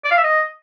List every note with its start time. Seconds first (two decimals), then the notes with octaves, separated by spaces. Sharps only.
0.04 D5
0.11 F5
0.17 E5
0.24 D#5